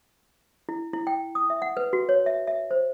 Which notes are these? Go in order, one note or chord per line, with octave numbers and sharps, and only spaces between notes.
E4
E4
G5
D#6
E5
F#5
B4
F#4
C#5
E5
E5
C5